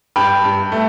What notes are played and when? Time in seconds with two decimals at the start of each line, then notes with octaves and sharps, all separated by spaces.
0.16 G2 G5 B5
0.44 G2
0.72 A3